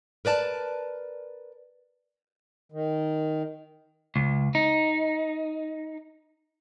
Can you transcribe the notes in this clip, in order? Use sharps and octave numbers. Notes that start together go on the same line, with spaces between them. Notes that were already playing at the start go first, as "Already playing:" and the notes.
A#4 B4 D5 A5
D#3
C#2
D#4